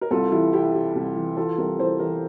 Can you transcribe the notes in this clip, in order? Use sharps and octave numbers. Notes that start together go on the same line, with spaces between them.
A#4
C2 F4 A4
E3 E4 G4
C3 E4 G4
C3
C2
E3
E3 F4 A4
C2 G4 A#4
E3 A4 C5
E3 G4 A#4